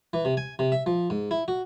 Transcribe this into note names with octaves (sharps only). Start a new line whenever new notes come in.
E3
C3
G#5
C3
E5
F3
G#2
E4
F#4